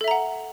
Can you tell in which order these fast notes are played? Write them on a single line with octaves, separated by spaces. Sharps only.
A4 E5 A#5 F#5